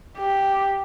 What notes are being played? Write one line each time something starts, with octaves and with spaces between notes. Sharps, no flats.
G4